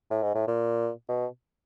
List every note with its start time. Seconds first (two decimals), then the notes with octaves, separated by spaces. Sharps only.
0.10 A2
0.22 G#2
0.35 A2
0.47 A#2
1.08 B2